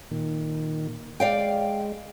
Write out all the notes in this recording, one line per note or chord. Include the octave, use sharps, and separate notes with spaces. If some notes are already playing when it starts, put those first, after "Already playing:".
A#2 D#3
G#3 D5 F5 G5